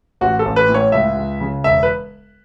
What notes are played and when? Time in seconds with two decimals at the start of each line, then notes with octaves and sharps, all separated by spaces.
0.21 A1 F#4
0.39 A4
0.45 A1
0.56 B4
0.69 A2
0.74 C#5
0.92 C#2 E5
1.16 C#2
1.40 C#3
1.64 E1 E5
1.83 B4